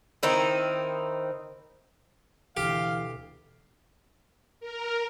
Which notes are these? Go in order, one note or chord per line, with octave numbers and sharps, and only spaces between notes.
D#3 C4 D#4 E4
D2 B2 E3 G4 F5
A#4